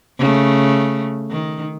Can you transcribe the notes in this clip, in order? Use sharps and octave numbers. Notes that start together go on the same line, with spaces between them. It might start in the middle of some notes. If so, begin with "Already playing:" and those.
C#3 A3
D#3